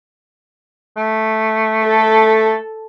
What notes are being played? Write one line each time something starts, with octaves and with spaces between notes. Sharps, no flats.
A3
A4